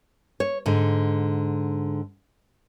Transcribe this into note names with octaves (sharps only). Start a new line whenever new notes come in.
C#5
G#2 D3